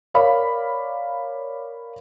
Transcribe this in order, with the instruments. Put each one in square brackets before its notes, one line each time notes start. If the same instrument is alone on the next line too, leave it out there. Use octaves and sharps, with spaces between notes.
[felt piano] A#4 C#5 D5 F5 B5